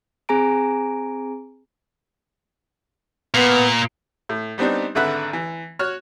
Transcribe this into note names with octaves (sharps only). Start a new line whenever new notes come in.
C4 G#4 G#5 A#5 D7
A#2 B3
A2
G3 B3 C4 D4 D#4
G#1 D3 B4 E5 F#5
E3
F#4 C#5 F6